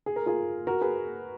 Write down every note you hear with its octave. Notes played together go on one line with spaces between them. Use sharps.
G#4
A#4
F4 G#4
F#4 A#4
G#4 B4